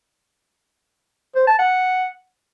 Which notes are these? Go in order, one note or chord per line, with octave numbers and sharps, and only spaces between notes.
C5
A5
F#5